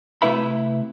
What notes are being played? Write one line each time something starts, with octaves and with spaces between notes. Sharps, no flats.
C3 A3 E4 B4 E5 B5